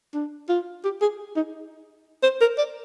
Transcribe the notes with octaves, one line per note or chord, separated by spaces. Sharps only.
D4
F4
G4
G#4
D#4
C5
A#4
D5